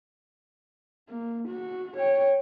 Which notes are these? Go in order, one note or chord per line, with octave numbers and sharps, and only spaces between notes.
A#3
F#4
C#5 G5